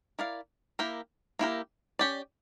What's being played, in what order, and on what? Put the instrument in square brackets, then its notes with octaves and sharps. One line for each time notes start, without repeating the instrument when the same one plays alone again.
[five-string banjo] E4 A#4 D5 F5
A#3 E4 G4 A#4
A#3 E4 G4 A#4
C#4 G4 D5